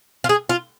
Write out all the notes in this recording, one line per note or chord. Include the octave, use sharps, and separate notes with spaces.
F4
G#4
F4